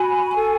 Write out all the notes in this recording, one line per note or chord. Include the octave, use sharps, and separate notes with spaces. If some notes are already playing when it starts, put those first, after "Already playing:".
Already playing: F#4 G#5 B5
A4